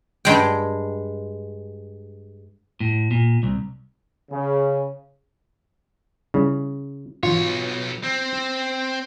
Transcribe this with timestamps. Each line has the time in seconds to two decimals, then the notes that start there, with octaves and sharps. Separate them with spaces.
0.25 G2 G#3 G5
2.80 A2
3.11 A#2
3.43 C2
4.31 C#3
6.34 C#3 G3 E4
7.23 B1 G#2 E3 F4 C#5
8.03 C4